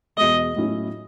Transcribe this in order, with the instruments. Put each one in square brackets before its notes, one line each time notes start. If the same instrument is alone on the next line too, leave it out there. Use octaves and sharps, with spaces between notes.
[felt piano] E2 B2 G#3 [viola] D#5
[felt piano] A2 F#3 C#4 E4